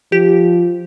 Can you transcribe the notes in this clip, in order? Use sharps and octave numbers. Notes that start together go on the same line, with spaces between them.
F3 G4